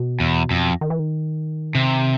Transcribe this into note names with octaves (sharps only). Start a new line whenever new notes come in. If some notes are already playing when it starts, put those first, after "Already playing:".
Already playing: B2
E2
F2
D#3
E3
D#3
C3